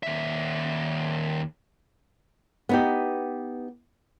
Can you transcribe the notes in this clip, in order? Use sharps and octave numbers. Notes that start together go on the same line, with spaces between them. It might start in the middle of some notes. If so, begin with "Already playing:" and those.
D#2 E5
B3 D#4 G4